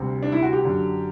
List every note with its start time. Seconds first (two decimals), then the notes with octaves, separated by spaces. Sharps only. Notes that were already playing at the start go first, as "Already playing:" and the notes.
Already playing: D2 C3 G3
0.23 D4
0.32 E4
0.43 F#4
0.53 G4
0.63 F#2 D3 F#3